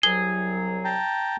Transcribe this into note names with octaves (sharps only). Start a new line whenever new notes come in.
C2 F#3 G#4 G7
G5 A5 A#5